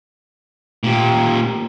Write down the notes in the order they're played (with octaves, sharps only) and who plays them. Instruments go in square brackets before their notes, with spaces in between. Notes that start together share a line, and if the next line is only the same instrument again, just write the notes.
[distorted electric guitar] A#2 G4